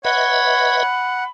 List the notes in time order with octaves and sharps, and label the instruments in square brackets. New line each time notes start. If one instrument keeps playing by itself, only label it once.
[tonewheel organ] B4 D#5 E5 [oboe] C#5 [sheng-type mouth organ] F#5 [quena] B5